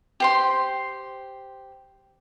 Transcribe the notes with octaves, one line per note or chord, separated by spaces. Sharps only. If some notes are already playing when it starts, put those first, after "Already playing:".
G4 C5 C6